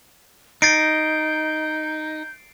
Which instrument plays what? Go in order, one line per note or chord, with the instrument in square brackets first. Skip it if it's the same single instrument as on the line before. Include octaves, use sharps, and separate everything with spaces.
[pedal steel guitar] D#4 [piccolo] G6 [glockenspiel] A6 C7 D7